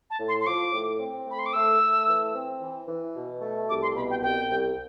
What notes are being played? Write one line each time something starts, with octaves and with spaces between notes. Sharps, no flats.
A5
A2
C6
C6
F3 D6
A2
C4
A3 B5
C6
D6
A3 E6
A3
E3
C4
E3
E3
B2
A3
C2 D6
C6
B2 B5
G5
C2 G5
C2